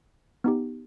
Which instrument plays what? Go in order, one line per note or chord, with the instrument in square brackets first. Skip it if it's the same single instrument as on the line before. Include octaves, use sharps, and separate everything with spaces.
[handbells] B3 D#4 G4